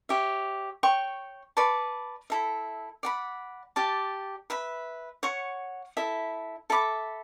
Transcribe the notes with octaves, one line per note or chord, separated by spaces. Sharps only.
G4 C#5 E5
C#5 G5 C#6
B4 D5 A5 C#6
E4 A4 E5
D5 F#5 B5
G4 D5 A5 D6
B4 E5 B5
C#5 F#5 C#6
E4 A4 E5
A4 E5 B5 D6